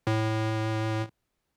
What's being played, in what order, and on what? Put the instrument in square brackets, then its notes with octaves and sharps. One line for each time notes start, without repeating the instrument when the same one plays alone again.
[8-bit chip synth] A2